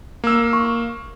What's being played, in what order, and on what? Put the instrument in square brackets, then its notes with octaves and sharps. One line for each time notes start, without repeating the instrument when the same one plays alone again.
[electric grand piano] A#3 E6
[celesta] C#6